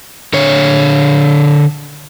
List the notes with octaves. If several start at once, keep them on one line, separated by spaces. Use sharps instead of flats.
D3 C#5